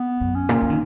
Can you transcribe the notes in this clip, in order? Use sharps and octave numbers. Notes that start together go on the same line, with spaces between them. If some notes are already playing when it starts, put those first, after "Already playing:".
Already playing: B3
F#2
C#4
A#2
E3
D#3